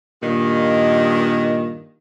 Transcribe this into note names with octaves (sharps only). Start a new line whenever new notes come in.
G2 A#2 D#3